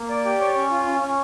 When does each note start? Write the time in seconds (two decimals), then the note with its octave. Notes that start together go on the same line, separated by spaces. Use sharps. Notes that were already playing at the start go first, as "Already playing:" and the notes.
Already playing: A#3
0.09 D5
0.25 G4
0.40 C#5
0.55 C#4
0.70 F4
0.86 C#4
1.01 C#4